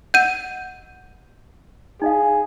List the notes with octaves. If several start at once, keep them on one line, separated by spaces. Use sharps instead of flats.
D#5 F#5 E6 G6 D#7
D#4 G#4 D#5 F5